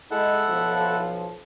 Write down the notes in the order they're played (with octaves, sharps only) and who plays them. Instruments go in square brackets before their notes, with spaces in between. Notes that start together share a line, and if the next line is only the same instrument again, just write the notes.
[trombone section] G#3 [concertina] E4 A4 F#5
[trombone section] B1 F3